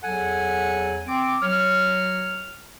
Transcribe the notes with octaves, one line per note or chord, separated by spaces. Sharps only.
E2 F#3 A4 F#5 G#5
C4 D6
F#3 C#5 F6